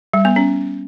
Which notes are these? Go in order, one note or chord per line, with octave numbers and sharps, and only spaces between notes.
G3
B3
C#4